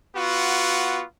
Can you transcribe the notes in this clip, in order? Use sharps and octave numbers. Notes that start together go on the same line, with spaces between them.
B3 F4 F#4